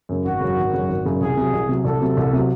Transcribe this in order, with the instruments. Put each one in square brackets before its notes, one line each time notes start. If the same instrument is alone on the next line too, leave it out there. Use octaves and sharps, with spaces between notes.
[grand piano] F#2 C#3
[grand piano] G#1 [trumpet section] F#4
[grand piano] F#2 C#3
G#1
F#2 C#3
G#1
F#2 C#3
[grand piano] C2 [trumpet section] G#4
[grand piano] C3 F#3
C2
C3 F#3
[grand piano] C2 [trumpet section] A4
[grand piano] C3 F#3
C2
C3 F#3